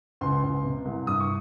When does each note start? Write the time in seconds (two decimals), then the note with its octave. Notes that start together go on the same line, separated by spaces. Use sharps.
0.21 C#2 C6
0.43 C#2
0.64 C3
0.85 C2
1.06 G2 D#6
1.20 C#6